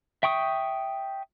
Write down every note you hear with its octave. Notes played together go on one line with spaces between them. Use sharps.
E5 G5 C#6 D#6